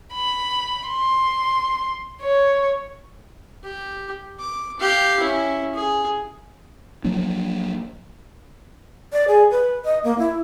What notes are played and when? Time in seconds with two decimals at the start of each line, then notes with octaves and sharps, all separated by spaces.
0.14 B5
0.88 C6
2.21 C#5
3.63 G4
4.40 D6
4.79 G4 F5
5.20 C#4 E4
5.75 G#4
7.04 F3 F#3 A#3 D4
9.13 D5
9.28 G#4
9.51 B4
9.85 D#5
10.04 A#3
10.19 E4